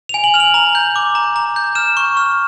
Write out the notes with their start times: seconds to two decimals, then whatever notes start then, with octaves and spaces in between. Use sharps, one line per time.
0.09 G#5 F7
0.24 F#7
0.34 F6 F7
0.40 F#7
0.54 A#5 F7
0.75 G6
0.96 D6
1.15 A#5
1.36 A#5
1.56 G6
1.75 F6 E7
1.97 C#6
2.17 F6